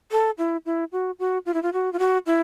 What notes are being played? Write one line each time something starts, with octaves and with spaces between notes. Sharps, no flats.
A4
E4
E4
F#4
F#4
F4
E4
F4
F#4
F4
F#4
E4